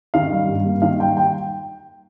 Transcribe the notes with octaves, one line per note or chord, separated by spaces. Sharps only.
D#3 F5
G3
G2
A#3
D#3 F5
G3 G5
G5